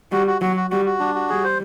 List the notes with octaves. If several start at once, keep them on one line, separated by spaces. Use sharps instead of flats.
G3 F#4
F#4
F#3 F#4
F#4
G3 F#4
F#4
G3 D4
F#4
G3 G#4
C5